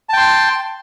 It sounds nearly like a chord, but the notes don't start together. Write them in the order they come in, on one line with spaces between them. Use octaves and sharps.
A5 G5 C6